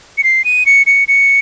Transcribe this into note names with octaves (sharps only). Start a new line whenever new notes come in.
C#7
C7
D#7
C#7
C#7
C#7